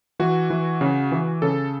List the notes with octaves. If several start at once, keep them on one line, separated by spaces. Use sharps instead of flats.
E3 F#4
E3
C#3
E3
C#3 A4